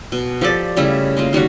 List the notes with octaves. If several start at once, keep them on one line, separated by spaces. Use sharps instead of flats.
B2
F3 G4 A4 D5
C#3 G3 A3 E4
G#3 A#3 F4
D#3 G3 A#3 F#4